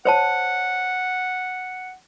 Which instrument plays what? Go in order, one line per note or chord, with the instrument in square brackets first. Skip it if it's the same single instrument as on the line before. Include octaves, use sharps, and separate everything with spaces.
[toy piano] C5 C#5 A5 [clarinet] F#5